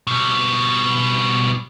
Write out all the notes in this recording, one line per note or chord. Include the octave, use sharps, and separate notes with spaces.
B2 G3